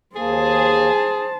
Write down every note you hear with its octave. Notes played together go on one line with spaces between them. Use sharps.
D#2 A#3 G#4 C5 A5